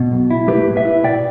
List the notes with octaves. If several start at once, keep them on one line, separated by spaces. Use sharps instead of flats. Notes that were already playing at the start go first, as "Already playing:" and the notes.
Already playing: B2
B1
E4
A3 G4 B4
A2
B4 E5
E4
B2 D5 G5